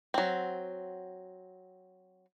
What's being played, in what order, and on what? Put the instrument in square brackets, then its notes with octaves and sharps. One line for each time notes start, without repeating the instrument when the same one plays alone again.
[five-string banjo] F#3 C4